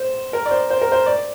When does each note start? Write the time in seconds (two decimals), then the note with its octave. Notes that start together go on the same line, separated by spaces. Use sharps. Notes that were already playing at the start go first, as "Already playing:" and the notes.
Already playing: C5
0.33 A#4
0.46 D5
0.51 C5
0.70 C5
0.82 A#4
0.92 C5
1.06 D5